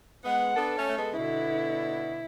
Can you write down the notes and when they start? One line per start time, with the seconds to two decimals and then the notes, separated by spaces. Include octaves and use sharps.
0.25 G#3 B3 F#5
0.56 B3 D4 A4
0.77 A3 C#4
0.88 A3
0.98 G#3 B3
1.11 C#3
1.18 B2 D3 E4